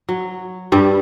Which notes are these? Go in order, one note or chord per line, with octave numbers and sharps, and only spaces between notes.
F#3
G2 G3